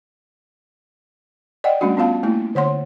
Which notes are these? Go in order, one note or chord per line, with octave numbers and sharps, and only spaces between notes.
D5 D#5 F#5 G5
G3 A3 C#4 D4 F#4
B3 C#4 F4 F5 A5
A3 A#3 E4
D3 C#5 F#5 C6